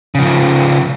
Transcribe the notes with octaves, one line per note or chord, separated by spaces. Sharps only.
C#3 F3